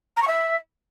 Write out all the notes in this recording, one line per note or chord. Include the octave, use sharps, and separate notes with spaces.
A#5
C#6
E5